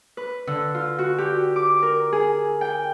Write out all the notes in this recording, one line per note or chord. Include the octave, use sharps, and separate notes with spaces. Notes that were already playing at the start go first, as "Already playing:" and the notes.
B4
D3
F4
F#4
G4
D6
A#4
G#4
G5